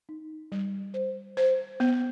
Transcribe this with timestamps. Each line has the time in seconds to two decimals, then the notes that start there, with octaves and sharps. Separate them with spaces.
0.09 D#4
0.52 G3
0.94 C5
1.37 C5
1.80 B3